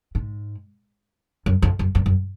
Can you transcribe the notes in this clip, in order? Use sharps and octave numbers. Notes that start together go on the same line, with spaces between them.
G#2
F#2
F2
F#2
F#2
F#2